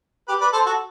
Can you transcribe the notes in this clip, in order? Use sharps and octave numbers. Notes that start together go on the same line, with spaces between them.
G4 B4
B4 D5
A4 C5
F#4 A4